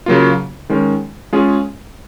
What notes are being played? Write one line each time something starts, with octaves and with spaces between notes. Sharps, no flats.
C#3 F#3 A#3 F4
D#3 G#3 C#4
G#3 C#4 F4 G#4